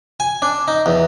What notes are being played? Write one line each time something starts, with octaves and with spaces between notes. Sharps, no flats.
G#5
D4
D#4
E2